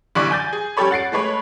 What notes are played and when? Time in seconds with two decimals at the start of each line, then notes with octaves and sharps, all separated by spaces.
0.15 B1 D3 E3 G3 D5 C#6
0.31 G#5 G6 A6
0.53 G#4
0.77 G3 C#4 G4 A4 C#5 B5
0.91 F#5 A6 C7 D7
1.12 G#3 A3 B4 C#5